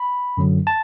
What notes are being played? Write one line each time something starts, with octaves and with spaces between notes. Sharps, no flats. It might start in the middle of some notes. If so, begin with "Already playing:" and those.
Already playing: B5
F#2 D3 F#3
A5